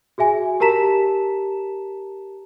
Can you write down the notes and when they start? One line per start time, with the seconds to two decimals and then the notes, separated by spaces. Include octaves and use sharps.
0.18 F#4 G#4 E5 G#5
0.60 G4 A#4 A5 A#5 B6 E7